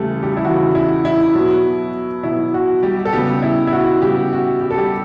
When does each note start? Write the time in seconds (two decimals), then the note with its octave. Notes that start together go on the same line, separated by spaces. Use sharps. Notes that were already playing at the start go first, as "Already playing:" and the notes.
Already playing: E2 C#3 E3 G3 A3 G4 A4
0.23 G3 G4
0.37 E4
0.45 E2 C#3 E3 F#4
0.75 E4
1.05 E4
1.35 B2 F#3 B3
2.23 B2 F#3 B3 E4
2.54 F#4
2.83 G3 G4
3.05 A4
3.13 C#3 G3 B3 G4
3.42 E4
3.67 E4
3.73 F#4
4.02 C#3 G3 B3 G4
4.33 F#4
4.61 G4
4.71 A4
4.78 G3 G4